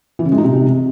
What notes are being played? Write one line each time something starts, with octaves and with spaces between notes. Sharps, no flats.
E3
C#3
G#3
D#4
C3